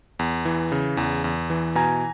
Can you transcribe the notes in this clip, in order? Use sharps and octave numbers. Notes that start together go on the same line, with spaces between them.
E2
E3
C#3
E2
E2
E3
B2 G#5 A#5